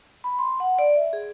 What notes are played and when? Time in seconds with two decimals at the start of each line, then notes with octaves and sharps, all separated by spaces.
0.24 B5
0.39 C6
0.60 F#5
0.79 D5
0.96 E5
1.13 G#4